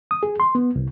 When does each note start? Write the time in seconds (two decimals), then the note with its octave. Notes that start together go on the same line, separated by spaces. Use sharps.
0.11 D#6
0.23 G#4
0.40 C6
0.55 B3
0.76 C2